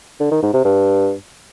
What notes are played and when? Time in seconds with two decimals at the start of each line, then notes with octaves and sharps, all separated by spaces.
0.20 D3
0.31 D#3
0.42 G#2
0.54 C3
0.65 G2